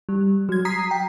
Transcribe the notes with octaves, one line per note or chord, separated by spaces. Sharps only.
G3
F#3 G#6
A#5 D#6 B6 C7
G5